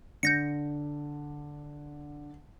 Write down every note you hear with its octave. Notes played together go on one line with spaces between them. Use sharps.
D3 G6 A#6 C#7